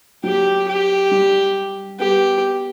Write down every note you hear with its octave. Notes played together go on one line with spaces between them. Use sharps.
F#3 G4
G4
G3
B3 G4